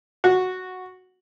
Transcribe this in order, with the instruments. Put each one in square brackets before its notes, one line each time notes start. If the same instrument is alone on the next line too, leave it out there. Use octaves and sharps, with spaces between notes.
[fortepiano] F#4